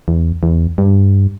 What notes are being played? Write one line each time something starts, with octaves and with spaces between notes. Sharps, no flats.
E2
E2
G2